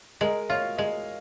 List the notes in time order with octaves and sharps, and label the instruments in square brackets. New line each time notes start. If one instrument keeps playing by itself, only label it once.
[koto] G#3 [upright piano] A#4 D#5
[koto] F4 [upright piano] C#5 F5
[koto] G#3 [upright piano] A#4 D#5